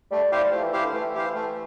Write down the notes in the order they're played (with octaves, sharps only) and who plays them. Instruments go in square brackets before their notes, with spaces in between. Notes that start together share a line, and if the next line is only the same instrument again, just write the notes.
[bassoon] G3 [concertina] A3
[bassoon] G3 [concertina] E4 G4 C5 F5
[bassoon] F3 [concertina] A3
[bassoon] E3
[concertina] E4 G4 C5 F5
[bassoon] D3
[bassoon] E3 [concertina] A3
[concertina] E4 G4 C5 F5
A3